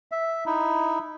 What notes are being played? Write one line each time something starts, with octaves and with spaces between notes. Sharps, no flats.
E5
D#4 E4